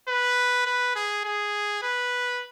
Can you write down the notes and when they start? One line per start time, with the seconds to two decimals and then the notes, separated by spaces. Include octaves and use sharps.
0.09 B4
0.66 B4
0.96 G#4
1.25 G#4
1.83 B4